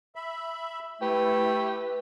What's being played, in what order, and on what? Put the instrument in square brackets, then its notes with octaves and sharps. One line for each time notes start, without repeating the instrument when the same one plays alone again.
[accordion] E5 B5
[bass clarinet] A3 [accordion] E4 [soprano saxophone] G4 [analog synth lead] B4